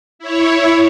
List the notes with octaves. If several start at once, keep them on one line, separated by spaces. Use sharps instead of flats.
E4 C#5